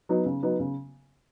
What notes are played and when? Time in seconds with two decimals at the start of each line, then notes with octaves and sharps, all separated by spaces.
0.09 F#3 B3 D#4
0.26 C#3
0.43 F#3 B3 D#4
0.59 C#3